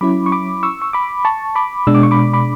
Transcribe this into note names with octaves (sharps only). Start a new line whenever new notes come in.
F#3 C#4 E4 B5 D6
C#6
B5 D6
C#6 E6
C#6
B5 D6
A5 C#6
B5 D6
B2 G#3 D4 E6
D6
C#6
B5 D6
B5 D6